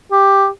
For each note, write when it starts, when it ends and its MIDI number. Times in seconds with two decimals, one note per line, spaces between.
0.12 0.48 67